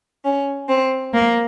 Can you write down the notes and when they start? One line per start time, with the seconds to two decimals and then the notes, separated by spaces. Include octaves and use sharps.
0.24 C#4
0.68 C4
1.13 A#3